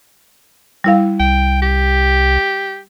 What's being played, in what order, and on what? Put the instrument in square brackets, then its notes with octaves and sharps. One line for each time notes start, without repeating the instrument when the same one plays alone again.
[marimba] G3 E4 F5
[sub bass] C2 [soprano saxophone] G5
[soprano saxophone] G4